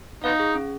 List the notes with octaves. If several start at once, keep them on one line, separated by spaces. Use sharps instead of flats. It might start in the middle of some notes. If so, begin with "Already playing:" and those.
B3 D#4 F5
G#4
C#4